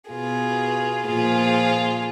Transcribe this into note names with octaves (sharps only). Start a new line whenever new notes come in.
B2 F4 G#4
A#2 F3 F4 G#4